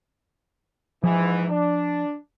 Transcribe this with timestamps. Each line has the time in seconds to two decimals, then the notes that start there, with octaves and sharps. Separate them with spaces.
1.04 G#2 E3 F3
1.50 D4